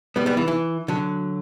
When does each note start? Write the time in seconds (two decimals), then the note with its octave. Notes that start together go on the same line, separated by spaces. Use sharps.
0.16 G3 B3
0.26 G3 B3
0.37 E3
0.48 E3
0.88 D3 F#3